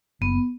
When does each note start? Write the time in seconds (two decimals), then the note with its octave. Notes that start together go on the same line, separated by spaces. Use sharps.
0.21 F#1 B3